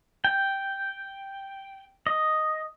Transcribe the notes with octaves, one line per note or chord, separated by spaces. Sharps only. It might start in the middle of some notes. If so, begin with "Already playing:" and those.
G5
D#5